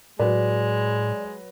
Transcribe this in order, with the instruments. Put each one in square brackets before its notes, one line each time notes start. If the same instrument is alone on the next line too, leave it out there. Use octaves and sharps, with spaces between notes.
[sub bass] A2 [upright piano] F#3 B4 [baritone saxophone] G#3 [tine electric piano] D5